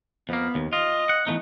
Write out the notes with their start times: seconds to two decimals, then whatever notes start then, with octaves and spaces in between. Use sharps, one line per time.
0.29 F2 A#3 B3
0.55 D#2
0.73 F4 D#5
1.09 F#5
1.27 E3 A3 B3 D#4